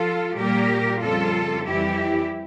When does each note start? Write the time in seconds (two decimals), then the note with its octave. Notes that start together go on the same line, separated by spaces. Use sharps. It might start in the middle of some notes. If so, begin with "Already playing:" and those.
Already playing: F3 F4 A4
0.37 A#2 G3 A#3 G4 A#4
1.01 F2 C#3 G3 A#3 F4 A4
1.65 F2 E3 G3 E4 G4